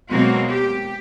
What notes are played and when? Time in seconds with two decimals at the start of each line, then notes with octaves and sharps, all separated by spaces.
0.11 B2 F#3 G#3 A#3 C4 F#4
0.49 G4